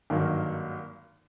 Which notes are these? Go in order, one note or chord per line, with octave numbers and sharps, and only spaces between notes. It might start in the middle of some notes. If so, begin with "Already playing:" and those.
G#1 G2 D#3 F#3 A#3